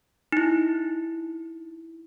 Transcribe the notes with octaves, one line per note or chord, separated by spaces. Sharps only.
D#4 E4